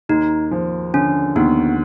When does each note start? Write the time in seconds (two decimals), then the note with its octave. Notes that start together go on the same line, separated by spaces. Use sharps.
0.09 D#2 D#4
0.51 F3
0.94 D3 C#4
1.36 D#2 B3